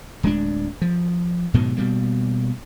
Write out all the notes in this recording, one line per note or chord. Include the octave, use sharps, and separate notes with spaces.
D1 G#3 A3 D4
F3
G#2 B2 D#3 F#3
B2 G3 A#3